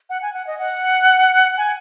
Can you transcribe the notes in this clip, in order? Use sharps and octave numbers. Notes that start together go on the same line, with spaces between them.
F#5
G#5
F#5
D#5
F#5
G#5